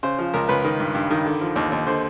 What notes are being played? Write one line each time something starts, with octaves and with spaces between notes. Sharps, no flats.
C#3 C5
F3
C#2 A#4
C#2 B4
D#3
G2
G2
D#3
D3
F3
D#2
D#2
D3 C5